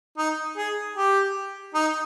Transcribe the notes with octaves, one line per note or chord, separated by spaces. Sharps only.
D#4
G#4
G4
D#4